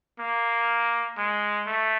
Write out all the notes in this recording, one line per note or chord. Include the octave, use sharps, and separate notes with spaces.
A#3
G#3
A3